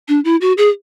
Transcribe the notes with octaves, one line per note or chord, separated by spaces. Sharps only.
D4
E4
F#4
G#4